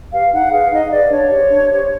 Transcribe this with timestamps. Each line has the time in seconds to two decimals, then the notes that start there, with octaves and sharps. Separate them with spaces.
0.12 G4 B4 F5
0.32 D#4 F#5
0.51 G#4 B4 F5
0.71 D#4 D#5
0.91 G#4 B4 D5
1.10 D4 C#5
1.30 G4 C5
1.50 D4
1.69 G4 C5